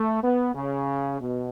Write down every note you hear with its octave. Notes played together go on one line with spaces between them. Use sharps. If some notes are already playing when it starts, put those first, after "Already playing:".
Already playing: A3
B3
C#3
B2